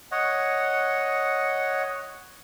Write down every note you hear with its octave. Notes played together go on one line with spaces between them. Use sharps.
C#5 D#5 F#5